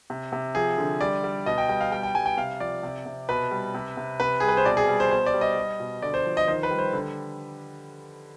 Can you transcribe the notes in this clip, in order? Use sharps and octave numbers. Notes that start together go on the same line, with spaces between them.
C3
C3
F3 G#4
D3
G3 D5
G3
B2 D#5
G5
G3 G5
F5
G3 G5
G5
G3 G#5
G5
C3 F5
F3 D5
C3
C3
B2 B4
G3
C3
C3
C3 B4
G3 G#4
B4
C5
B2 D5
G#4
G3
C5
B2 C5
D5
G3
D#5
G3
B2
D3 D5
C5
F3
D#5
D#3 C5
B4
G3
C5
D3